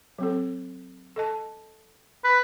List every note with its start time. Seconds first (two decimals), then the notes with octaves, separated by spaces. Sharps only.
0.18 F#3 C4 A4
1.16 A4 D#5 A5
2.24 B4